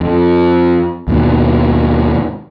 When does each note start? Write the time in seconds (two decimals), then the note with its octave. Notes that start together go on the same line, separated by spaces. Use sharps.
0.01 F2
1.08 D#2 G#2 B2